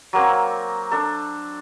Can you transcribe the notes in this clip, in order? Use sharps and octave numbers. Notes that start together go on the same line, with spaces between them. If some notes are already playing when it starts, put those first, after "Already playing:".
F#3 A#3 C4
D4 A4